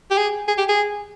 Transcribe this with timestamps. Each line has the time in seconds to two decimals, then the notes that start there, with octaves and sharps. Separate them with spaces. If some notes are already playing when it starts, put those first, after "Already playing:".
0.11 G4
0.18 G#4
0.48 G#4
0.58 G4
0.69 G#4